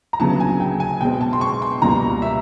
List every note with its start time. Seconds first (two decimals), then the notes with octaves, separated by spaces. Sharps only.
0.13 A#5
0.20 D2 C#3 F#3 B3 A5
0.40 G#5
0.60 G5
0.80 G#5
1.01 B2 G#3 C4 G5
1.21 A5
1.33 C6
1.41 C#6
1.62 C6
1.82 C#2 B2 G3 A#3 A#5
2.22 E5